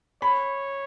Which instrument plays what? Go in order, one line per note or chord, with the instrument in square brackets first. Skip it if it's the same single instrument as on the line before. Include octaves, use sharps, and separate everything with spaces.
[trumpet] C#5 [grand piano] B5